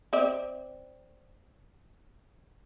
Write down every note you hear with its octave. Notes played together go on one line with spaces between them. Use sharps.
C4 D5 E5